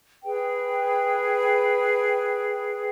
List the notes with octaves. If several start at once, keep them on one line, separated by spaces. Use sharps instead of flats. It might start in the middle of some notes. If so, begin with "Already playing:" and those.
G#4 B4 G5